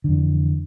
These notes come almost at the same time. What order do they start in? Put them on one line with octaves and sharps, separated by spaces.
D3 F2 E3